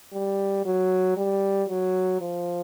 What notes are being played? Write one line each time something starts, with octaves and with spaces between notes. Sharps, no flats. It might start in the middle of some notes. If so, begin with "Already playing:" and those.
G3
F#3
G3
F#3
F3